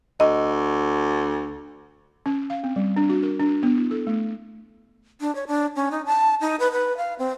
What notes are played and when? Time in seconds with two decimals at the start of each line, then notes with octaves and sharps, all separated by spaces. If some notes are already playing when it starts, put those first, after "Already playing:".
0.20 D2 D#5
2.26 C#4
2.50 F5
2.64 C4
2.76 G3
2.96 D4
3.09 F#4
3.23 A#4
3.40 D4
3.63 B3
3.77 E4
3.91 A4
4.07 A3
5.21 D4
5.35 C#5
5.47 D4
5.76 C#4
5.91 D#4
6.06 A5
6.41 D#4
6.60 B4
6.72 B4
6.97 F5
7.19 C4